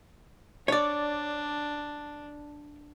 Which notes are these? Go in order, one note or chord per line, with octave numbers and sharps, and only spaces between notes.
D4 C#5 D5